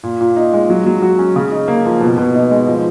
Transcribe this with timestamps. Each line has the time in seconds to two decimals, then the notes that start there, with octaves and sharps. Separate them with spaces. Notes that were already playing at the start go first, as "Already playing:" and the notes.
0.03 A#2
0.21 A#2
0.37 D#4
0.53 G#3
0.70 F#3
0.86 F#3
1.02 F#4
1.18 C#4
1.36 C#3
1.52 D#4
1.68 A#3
1.85 F3
2.01 B2
2.18 B2
2.34 D#4
2.51 G#3
2.67 F3